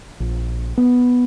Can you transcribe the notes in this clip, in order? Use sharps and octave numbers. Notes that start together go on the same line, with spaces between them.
A#1
B3